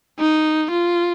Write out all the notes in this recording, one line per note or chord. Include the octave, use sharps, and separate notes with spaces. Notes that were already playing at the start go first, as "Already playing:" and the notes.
D#4
F4